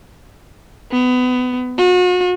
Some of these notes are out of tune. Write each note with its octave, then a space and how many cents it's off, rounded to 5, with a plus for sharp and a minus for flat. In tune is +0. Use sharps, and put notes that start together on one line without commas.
B3 +25
F#4 -40